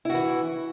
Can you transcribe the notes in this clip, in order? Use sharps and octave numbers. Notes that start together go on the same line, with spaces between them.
E3 E4 F#4